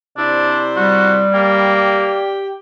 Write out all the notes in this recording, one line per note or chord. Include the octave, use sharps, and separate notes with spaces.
C3 D4 E4 C5 D5
G3 F#4
A#3 G4 G5